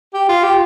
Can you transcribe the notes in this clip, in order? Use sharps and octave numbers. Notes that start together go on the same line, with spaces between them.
G4
F4
G4